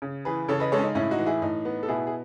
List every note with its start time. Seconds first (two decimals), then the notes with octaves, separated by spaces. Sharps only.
0.02 C#3
0.25 E3 G#4 B4
0.48 C#3 A4 C#5
0.60 B4 D#5
0.72 G#3 A4 C#5
0.79 C#4
0.84 D#4
0.95 A2 C#4 E4
1.11 D#4 F#4
1.19 E3
1.26 E4 G#4
1.42 A2 D#4
1.65 B3
1.83 A4
1.88 B2 E4 G#4
2.07 G#4